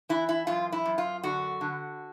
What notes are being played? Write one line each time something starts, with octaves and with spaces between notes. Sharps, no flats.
E3 E4
E4
F#2 F4
E4
F#2
F4
D3 F#4
D3